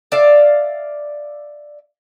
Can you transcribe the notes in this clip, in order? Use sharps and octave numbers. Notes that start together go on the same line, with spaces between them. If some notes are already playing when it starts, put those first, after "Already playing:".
D5 E5 F5